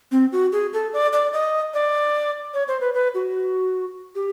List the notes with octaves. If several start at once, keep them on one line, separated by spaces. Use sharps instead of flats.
C4
F#4
G#4
A4
D5
D5
D#5
D5
C#5
C5
B4
B4
F#4
G4